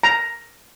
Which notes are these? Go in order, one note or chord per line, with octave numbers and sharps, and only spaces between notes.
A#5